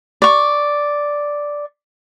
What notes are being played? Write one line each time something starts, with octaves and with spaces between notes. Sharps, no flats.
D5 C#6